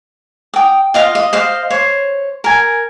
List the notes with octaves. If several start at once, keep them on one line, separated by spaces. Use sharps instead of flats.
G5 D#6
F4 D#5 F5 C6
D#5
C5 D#5 F5
C5 C#5
A#4 G#5